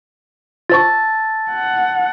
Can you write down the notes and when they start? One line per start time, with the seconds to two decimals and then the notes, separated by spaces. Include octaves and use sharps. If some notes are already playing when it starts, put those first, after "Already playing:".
0.69 F4 C5 A5 C#6 E6 A6
1.51 F#5